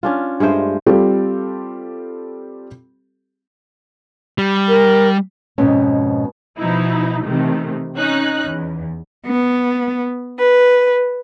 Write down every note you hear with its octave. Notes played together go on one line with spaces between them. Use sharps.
C#4 D4 F4
G2 G#3 A3 C5
G3 C4 F4 G4 A4
G3
A#4
F2 G#2 B2 B3 C#4
B2 F3 D#4 E4
C3 D#3 E3 A3
C#4 D#4 F#6
E2
B3
B4